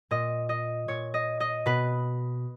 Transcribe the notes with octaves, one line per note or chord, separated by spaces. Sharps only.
A#2 D#5
D#5
A#2 C#5
D#5
D#5
B2 B4